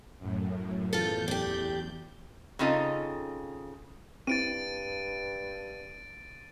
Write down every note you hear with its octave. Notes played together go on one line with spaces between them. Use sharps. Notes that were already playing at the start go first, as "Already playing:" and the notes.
F#2 A2
E2 F4 A4 G6
D4 G4
C#3 C4 D#4 F4 A4 D#5
G2 C4 E4 A6 D7 D#7